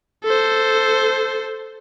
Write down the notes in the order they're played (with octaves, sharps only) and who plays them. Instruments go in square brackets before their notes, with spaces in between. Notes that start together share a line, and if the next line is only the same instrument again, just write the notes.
[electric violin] A4 C5